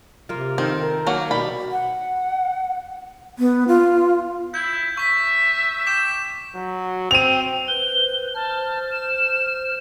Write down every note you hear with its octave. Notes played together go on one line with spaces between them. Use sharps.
C3 A#3 F4
D#3 C4 A4
A#4
F#3 A#3 F#4
B2 G3 B5
F#5
B3
F4
E4 G6
E5 C#6 B6
G5 D6 B6 E7
F#3
C4 D#7 F7
B4 C5 G7
C5 A5 F6
E7